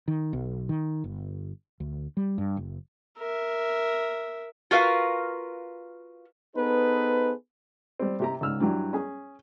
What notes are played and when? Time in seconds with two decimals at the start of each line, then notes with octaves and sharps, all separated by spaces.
0.08 D#3
0.33 B1
0.69 D#3
1.04 G1
1.80 D2
2.17 G3
2.38 G2
2.57 F#1
3.18 A#4 E5
4.71 F4 F#4 A#4 B4 F5
6.56 B3 D#4 G#4 A4 B4 C5
7.99 G3 C4
8.20 C3 G4 A#5
8.41 C#2 G#2 E6 F6
8.60 G2 E3 F#3 G3
8.93 C#4 G#4